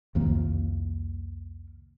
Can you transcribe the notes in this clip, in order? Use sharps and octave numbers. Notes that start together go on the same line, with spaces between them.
C2 F2 D#3 A#3